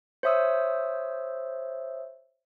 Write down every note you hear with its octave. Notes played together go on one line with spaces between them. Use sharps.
C5 C#5 E5 D#6 E6